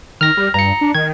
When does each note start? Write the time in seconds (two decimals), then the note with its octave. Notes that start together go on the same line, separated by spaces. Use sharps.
0.21 D#3 F6 A#6
0.37 G3
0.54 G2 A#5 C#7
0.81 D4
0.95 D#3 G#6